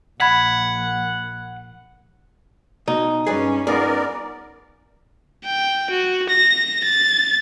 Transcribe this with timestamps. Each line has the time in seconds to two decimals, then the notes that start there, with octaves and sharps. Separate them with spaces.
0.20 A#1 F#5 B5 G#6 B6
2.87 B2 D#4
3.27 G2 C#4 G#4 B4 D5
3.67 B3 D#4 F4 G#4 A#4 D5
5.45 G5
5.90 F#4
6.30 A#6
6.84 A6